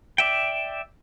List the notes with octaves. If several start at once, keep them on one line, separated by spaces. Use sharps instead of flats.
D5 E5 G5